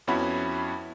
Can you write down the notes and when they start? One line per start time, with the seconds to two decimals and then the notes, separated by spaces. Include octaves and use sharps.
0.07 F2 B3 C#4 E4 F#4 B5